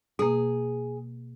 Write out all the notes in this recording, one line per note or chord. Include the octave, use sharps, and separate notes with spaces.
B2 A#3 G#4